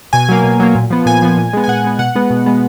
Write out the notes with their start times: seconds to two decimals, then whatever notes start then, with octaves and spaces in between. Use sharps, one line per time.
0.13 B2 G#5
0.29 F#3 A#3
0.44 B2
0.60 F#3 A#3
0.75 A#2
0.90 F3 B3
1.06 A#2 G#5
1.22 F3 B3
1.37 A#2
1.53 G#3 B3
1.64 G#5
1.68 A#2 F#5
1.84 G#3 B3
1.99 B2 F#5
2.15 G#3 B3
2.30 B2
2.46 G#3 B3